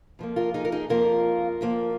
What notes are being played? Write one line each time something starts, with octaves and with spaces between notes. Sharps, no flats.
F2 F3 A#3
F4 A#4
D#4 G#4
A#4
D#4 G#4
F2 F3 A#3 F4 A#4
F2 F3 A#3